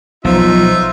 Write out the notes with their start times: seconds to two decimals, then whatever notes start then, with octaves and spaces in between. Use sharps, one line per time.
0.25 B1 F3 D#4 F4 E5